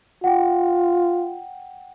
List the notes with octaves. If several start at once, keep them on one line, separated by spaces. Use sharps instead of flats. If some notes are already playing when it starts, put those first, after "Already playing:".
F4 F#5 G5